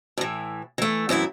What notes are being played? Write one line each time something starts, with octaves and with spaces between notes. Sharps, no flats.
A2 E3
E3 A3
F#2 E3 C4 E4